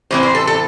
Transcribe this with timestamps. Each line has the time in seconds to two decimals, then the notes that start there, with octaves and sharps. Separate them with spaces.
0.11 A2 E3 C4 C5
0.23 C5
0.35 A4
0.47 A4